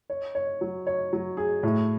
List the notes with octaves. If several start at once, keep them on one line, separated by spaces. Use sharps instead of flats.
C#5
C#5
F#3
C#5
F#3
G#4
A2